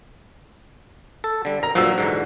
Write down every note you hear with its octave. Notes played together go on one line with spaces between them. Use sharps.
A4
D3 G3
A#4 A#5
G2 A#2 F3 F#3 F#4 E6
G#2 D3 E3